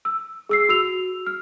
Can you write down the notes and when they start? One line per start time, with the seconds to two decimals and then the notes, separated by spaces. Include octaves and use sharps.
0.05 E6
0.49 G#4 E6 C7
0.69 F#4 E6 F7
1.26 F6